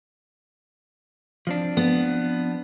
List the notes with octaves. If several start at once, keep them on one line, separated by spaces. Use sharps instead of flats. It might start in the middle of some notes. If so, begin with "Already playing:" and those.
F3 C4 D4
B3